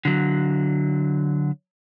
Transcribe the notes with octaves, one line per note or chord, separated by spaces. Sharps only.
D3 F#3